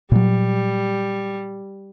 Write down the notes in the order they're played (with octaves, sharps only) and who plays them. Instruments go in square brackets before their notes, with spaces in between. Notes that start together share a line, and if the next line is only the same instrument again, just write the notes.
[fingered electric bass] A#2 F#3 [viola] G3